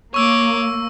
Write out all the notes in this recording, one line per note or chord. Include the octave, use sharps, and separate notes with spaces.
A#3 C#5 C#6 D6 E6